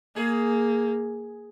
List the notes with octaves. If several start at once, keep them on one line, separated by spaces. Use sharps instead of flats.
A#3 G#4